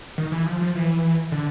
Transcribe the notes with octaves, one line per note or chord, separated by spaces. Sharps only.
D#3
E3
F3
F3
E3
D3